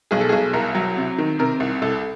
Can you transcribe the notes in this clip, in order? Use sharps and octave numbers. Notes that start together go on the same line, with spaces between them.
B1 G#4
A4
G#4
B1
C2 A#4
F#3
C3
D#3
C3 A#4
C2
C2 A4